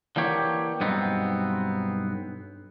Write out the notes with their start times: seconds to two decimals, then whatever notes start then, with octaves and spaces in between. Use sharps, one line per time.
0.16 D3 E3 A#3 G4 C#5
0.80 B1 G2 B3 C4 D#4